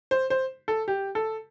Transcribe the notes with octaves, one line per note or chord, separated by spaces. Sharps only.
C5
C5
A4
G4
A4